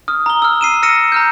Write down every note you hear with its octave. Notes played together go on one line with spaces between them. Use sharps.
D#6 F6
A#5 G7
E6 F6
C7 D#7 E7
E6 F6 A#6 C#7 D#7 E7
A#5 F6 G6